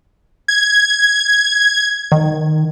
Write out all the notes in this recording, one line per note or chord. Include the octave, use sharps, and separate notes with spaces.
G#6
D#3